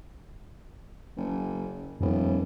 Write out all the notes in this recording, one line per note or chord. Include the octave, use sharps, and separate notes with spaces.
F#1
D#1 F2 B3